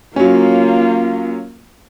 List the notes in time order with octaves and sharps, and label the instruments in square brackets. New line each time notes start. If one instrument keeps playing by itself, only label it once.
[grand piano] F#3 C#4 [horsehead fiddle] A#3 F4